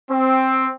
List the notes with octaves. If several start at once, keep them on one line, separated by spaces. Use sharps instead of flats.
C4